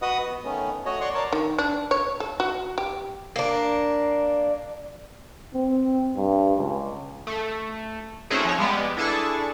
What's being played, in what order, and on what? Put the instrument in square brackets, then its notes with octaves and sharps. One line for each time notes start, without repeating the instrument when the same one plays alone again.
[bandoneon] F#4 B4 D#5 F#5 D#6
B3
D#3 A3 B3 C#4
A3 F#4 C#5 D#5
C#5 D5 F#5 C6 C#6
A#4 C#5 D5 A5
[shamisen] D#3
D4
C#5
A4
F#4
G4
[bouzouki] A#3 D4
[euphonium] C4
G2
C#2
[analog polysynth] A3
A3 C4 C#4 D#4 F#4 G#4
F3 C#5
G3 G#3 B3 G4
D4 E4 G#4 A4 A5 C#6